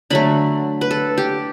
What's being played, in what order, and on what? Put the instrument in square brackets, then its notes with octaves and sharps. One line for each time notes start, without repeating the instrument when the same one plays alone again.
[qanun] D3 F#3 A3 B5
B4
A4
G4